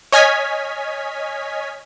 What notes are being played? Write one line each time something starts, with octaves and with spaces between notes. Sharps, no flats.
C#5 D#5 G#5 F6 G#6 B6